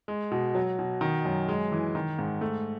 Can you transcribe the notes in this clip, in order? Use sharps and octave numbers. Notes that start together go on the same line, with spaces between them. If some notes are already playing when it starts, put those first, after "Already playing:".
G#3
B2
F#3
B2
D#3
F#2
G#3
E3
D#3
G#2
A3